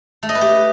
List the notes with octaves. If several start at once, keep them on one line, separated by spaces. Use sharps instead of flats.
A3
D#5
B4
G4